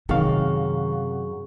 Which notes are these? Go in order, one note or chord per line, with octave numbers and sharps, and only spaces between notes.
F#2 C3 D#3 G#4 F5 C#6